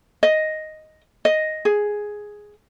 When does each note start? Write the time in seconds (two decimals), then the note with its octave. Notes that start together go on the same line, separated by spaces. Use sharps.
0.23 D#5
1.25 D#5
1.65 G#4